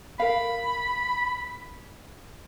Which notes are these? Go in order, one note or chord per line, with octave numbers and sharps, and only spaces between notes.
A#4 F5 B5